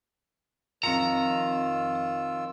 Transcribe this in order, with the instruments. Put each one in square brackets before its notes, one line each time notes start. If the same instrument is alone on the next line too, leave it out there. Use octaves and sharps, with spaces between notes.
[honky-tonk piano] F2 C#7 [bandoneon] D#3 F4 E6 [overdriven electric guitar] A#5